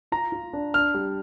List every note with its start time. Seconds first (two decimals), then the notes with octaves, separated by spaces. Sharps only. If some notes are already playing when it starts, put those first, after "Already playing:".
0.12 F4 A#5
0.32 F4
0.53 D4
0.74 D4 F6
0.94 G3